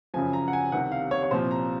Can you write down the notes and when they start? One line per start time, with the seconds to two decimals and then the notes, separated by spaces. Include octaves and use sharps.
0.14 F#2 C#3 F3 G#5
0.33 A#5
0.48 F#5
0.53 G#5
0.72 C2 C3 D#3 F#5
0.92 F5
1.11 C#5
1.23 C#5
1.31 C2 A#2 F3 C5
1.51 A#5